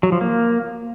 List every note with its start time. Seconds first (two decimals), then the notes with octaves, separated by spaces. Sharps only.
0.03 F#3
0.12 F3
0.21 A#3